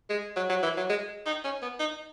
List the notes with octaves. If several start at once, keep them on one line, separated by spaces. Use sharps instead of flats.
G#3
F#3
F#3
E3
F#3
G#3
D#4
C#4
B3
D#4